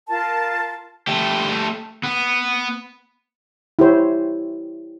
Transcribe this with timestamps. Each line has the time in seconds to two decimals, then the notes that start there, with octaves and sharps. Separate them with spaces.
0.09 F4 A#4 A5
1.08 A3 G4
2.03 B3
3.79 E4 G4 C5 C#5